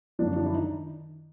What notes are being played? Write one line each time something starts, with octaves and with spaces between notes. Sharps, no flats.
F#2 D3 F3 D4
D4
E4
D#3 D#4